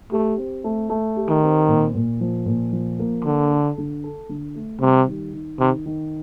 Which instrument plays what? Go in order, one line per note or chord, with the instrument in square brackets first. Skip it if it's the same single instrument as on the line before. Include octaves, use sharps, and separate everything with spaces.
[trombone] A3 [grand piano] G4
[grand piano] C4
A3
A3
G4
[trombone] D#3
[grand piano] C4
A#2
A#2
F3
A#2
F3
A#3
[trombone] D3 [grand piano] D4
[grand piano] A4
D3
A4
D3
A3
[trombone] C3 [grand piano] G3
[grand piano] D#3
D#3
[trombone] C3 [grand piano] D#3
[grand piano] D#3